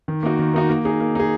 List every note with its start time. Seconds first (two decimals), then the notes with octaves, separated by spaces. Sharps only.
0.08 D#3
0.23 A#3 D#4 F#4
0.39 D#3
0.54 A#3 D#4 F#4
0.69 A#3
0.85 D#4 G#4
1.01 A#3
1.15 D#4 G#4